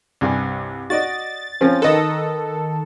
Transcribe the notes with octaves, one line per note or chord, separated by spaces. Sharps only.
C2 G2 G#5
F#4 D5 D#5 A6
F3 C4 C#4
D#3 A4 B4 D#5